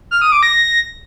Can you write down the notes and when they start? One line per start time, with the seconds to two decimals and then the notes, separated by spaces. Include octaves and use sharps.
0.11 F6
0.22 D#6
0.32 D6
0.43 A#6